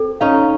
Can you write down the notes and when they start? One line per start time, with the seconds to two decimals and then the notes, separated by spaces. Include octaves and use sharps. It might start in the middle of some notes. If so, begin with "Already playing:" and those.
Already playing: C4 A4
0.21 C#4 D#4 F5